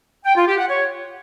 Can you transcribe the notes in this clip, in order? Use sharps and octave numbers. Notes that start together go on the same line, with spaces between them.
G5
F4
G4
F#5
C#5